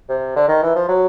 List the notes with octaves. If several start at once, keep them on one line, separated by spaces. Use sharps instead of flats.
C3
D3
D#3
E3
F3
F#3